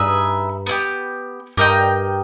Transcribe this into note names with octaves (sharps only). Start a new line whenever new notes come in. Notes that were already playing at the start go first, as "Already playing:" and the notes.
Already playing: G2 D#4 G#4 B4 E5
B3 E4 G4
G2 G4 A#4 D#5 G5